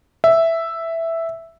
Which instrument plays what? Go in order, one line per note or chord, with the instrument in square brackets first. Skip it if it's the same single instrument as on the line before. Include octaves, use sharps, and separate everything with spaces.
[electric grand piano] E5